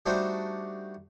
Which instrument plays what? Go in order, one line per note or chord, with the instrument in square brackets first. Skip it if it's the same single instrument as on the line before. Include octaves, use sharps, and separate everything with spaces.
[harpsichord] G3 A3 D4 D#4 F#4 C5